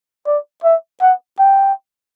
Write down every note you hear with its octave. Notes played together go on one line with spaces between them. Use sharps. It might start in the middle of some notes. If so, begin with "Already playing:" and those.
D5
E5
F#5
G5